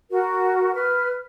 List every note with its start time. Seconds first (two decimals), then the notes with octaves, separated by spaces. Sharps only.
0.10 F#4 A#4
0.74 B4 F6